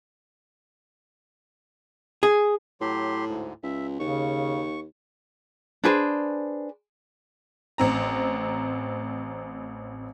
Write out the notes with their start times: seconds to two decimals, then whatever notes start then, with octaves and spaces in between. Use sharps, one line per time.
2.23 G#4
2.81 A2 F#3 G4 C6
3.28 D2 G#2
3.63 C#2 E5
4.00 D#2 C#3 C#6
5.84 D4 G#4 B4 C5
7.78 A1 C4 A#5